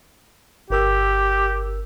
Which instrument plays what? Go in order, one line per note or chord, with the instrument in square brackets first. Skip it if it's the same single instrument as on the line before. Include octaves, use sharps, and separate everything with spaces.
[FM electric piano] G1 A#4 E6 [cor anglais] G4